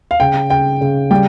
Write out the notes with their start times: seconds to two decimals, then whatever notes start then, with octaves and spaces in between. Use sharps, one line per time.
0.11 F5
0.20 C#3 G5
0.50 C#3 G5
0.81 C#3
1.10 G3 G5